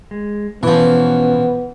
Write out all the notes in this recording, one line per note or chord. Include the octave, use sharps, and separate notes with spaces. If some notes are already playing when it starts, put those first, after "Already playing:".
G#3
B2 E3 F3 B3 C#4